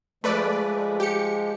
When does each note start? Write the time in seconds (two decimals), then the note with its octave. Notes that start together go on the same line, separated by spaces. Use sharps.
0.24 F3 G#3 A3 B4 D5
1.00 G4 C#7